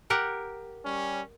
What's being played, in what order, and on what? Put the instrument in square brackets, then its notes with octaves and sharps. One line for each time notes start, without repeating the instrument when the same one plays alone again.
[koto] G4 A#4 F#5
[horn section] G3 C#4